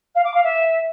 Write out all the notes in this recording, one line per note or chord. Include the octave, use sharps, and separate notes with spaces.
F5
D6
F5
E5